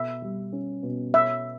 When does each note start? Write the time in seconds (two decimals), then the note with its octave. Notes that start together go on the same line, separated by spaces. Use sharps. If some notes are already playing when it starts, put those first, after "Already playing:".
Already playing: B2 E5
0.22 G3
0.52 C#4
0.83 B2
1.14 C#5 E5